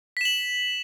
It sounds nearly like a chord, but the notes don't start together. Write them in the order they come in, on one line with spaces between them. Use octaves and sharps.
B6 E7 F#7